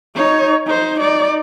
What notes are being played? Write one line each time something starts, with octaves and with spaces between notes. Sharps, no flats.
D#4 C#5
D#4 C5
D#4 D5